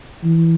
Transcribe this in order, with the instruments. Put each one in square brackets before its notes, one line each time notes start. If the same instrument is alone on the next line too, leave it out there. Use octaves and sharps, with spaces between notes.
[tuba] E3